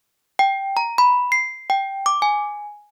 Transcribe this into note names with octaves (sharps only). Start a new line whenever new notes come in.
G5
A#5
B5
C7
G5
D6
G#5